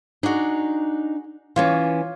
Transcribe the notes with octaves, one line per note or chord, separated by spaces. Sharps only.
D4 D#4 F#4 G#4
E3 C#4 F4 C#5 D6